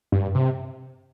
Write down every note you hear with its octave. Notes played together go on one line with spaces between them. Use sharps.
G2
C3